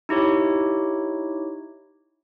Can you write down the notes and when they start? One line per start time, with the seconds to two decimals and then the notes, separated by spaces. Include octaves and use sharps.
0.09 D#4 E4 G4 C#5